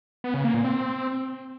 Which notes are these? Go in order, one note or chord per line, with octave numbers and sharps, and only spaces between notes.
B3
C#3
A#3
A#2
C4